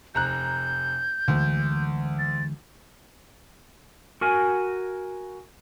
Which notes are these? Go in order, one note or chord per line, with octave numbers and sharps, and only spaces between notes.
F1 A#5 F#6 G6
D2 D3 E3 G#3
A6
F#4 A#4 G#5